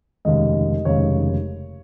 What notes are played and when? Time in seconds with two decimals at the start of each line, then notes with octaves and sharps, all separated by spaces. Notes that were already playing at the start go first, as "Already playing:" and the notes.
0.25 F1 D#2 C#3 G#3 D#5
0.85 F1 D#2 C#3 G#3 C#5